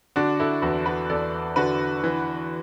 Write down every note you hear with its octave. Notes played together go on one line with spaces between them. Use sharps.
D3 D4 F#4
E4 A4
E2 F#4 B4
F#4 B4
E2 A4 D5
D3 F#4 B4
E3